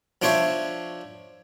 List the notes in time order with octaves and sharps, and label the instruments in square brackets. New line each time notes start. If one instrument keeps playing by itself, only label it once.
[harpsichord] F3 D4 C5 C#5 E5